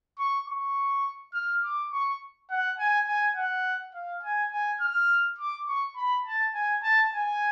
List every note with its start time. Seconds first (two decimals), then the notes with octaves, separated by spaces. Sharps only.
0.19 C#6
0.48 C#6
1.34 F6
1.63 D6
1.92 C#6
2.50 F#5
2.79 G#5
3.07 G#5
3.36 F#5
3.95 F5
4.23 G#5
4.52 G#5
4.81 F6
5.39 D6
5.68 C#6
5.96 B5
6.25 A5
6.54 G#5
6.83 A5
7.13 G#5